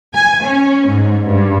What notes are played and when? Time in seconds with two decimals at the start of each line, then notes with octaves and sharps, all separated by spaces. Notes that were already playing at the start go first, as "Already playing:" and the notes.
0.14 G#5
0.45 C#4
0.88 G#2
1.28 G2